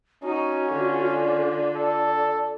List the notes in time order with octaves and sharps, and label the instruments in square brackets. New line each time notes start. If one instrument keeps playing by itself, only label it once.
[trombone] C#4 [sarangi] D#4 [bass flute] F#4
[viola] D3 [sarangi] F4
[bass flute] D5
[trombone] A4